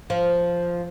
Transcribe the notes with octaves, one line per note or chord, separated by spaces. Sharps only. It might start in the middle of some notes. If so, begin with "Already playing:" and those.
F3